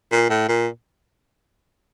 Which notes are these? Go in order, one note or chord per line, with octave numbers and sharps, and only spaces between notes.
A#2
A2
A#2